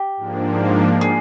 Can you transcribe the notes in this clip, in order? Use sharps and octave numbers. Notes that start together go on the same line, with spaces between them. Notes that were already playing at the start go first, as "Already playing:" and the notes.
Already playing: G4
G#2 F3 A#3 D4
G#4